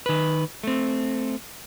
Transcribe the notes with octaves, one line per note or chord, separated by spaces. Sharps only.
D#3 B4
A3 C4